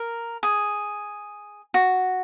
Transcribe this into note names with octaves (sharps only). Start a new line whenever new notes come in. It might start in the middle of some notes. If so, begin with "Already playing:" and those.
Already playing: A#4
G#4
F#4